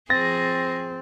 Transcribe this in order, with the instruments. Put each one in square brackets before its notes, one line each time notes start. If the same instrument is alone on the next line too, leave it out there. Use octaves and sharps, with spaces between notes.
[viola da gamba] F3 G#4 [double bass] C4 [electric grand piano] A6 [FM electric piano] A#6